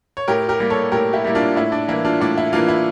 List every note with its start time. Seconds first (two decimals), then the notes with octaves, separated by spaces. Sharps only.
0.17 C#5
0.28 A2 G4 A#4
0.49 G4 A#4
0.60 G3 A#3
0.70 A4 C#5
0.92 A2 G4 A#4
1.13 E4 G4
1.24 G3 A#3 E4
1.35 D4 F4
1.56 A2 E4
1.72 D4
1.88 E3 A#3 E4
2.05 D4 F4
2.21 A2 D4
2.38 E4
2.53 E3 A#3 D4 F4
2.69 E4